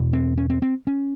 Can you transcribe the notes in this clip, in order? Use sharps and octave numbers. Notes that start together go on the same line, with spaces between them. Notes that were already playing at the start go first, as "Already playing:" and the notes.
Already playing: E2 B2
C4
C#4
C4
C4
C#4